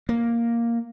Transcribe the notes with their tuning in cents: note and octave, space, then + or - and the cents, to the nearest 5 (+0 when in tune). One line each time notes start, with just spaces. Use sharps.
A#3 +0